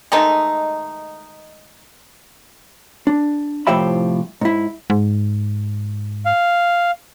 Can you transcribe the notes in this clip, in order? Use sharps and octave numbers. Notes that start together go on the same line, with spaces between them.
D#3 G#3 A3 D#4
D4
C2 A2 F3 G4 E5 B5
G#2 E4
G#2
F5